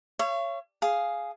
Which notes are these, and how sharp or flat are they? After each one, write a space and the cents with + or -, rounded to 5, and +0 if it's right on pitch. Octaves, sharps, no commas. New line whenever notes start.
C#5 +0 F5 -45
G#4 +0 F5 +0